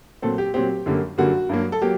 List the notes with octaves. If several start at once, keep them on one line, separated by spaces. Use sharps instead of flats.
A#2 F#3 C4 A4
G4
A#2 F#3 C4 G4
F#2 D3 G3 A#3
F#2 D3 G3 A#3 F#4
G2 F#3 A#3
A4
F#3 A#3 G4